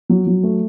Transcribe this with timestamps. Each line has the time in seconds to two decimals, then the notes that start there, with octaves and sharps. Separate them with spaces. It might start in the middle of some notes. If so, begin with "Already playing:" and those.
0.10 F#3
0.27 F#3
0.43 A3